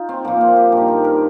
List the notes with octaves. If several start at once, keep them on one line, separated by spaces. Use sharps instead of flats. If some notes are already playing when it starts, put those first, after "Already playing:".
Already playing: D#4 F4
C4
A#2 F3 A#3
C4
G4
G2 D#3 A#4
G4
A#4